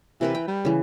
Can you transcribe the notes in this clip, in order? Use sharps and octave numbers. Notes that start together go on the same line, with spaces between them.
C3 E3 A#4 B4
G5
G3
C#3 E3